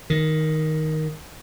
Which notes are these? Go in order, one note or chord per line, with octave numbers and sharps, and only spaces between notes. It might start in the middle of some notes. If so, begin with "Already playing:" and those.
D#3